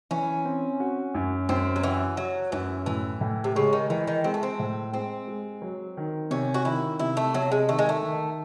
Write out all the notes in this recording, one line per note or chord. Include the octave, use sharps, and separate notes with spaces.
E3 C#4
C4
F#4
F#2
F#2 C4
F#3
E3 F#4
F#3 F#4
F#2 E3
A2 E3
A2
C3
C#3 G#3
D#3
D#3 E3
D#3
G#3 C4
A3
C4
A2
G#3 C4
G#3
F#3
D#3
C3 C#4
F#4
D#3 E4
C3 E4
A3
C3 F#3
G#3
D#3 A3
G#3
A3
D#3